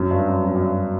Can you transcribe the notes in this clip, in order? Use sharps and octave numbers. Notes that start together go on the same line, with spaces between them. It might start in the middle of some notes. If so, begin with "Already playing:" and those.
Already playing: F#2
G2
F#2
F#2
F#2
G2